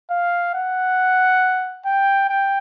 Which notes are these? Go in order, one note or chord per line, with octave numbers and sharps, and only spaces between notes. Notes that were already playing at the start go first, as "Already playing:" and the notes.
F5
F#5
G5
G5